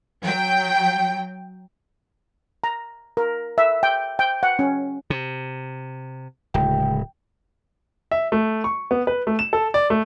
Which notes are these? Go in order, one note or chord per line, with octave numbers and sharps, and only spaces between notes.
F#3 G5
A#5
A#4
E5
G5
G5
F#5
C#4
C3
D1 C#3 G#3 G5
E5
A3
C#6
B3
B4
A3
E7
A4
D5
A3